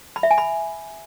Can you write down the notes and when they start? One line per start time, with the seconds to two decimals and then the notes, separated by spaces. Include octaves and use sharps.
0.16 B5
0.23 E5
0.31 G#5
0.38 B5